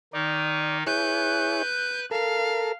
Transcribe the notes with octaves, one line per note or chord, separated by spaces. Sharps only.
D#3 D#4 D5
E4 G#4 B4 C#5 F#6 G6
A4 A#4 F5